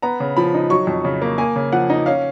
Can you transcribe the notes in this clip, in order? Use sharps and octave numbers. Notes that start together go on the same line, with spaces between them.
B3 A#5
C#3
F3 B5
D#4
F#3 C#6
F2
C#3
A#3
A#3 G#5
C#3
F3 F#5
D#4
C#4 F5